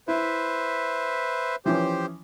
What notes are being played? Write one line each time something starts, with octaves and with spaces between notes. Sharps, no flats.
E4 B4 C5 E5
E3 F3 C#4 G4 C5